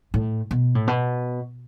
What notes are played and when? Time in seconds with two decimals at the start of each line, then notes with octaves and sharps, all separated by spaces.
0.14 A2
0.51 B2
0.75 A2
0.87 B2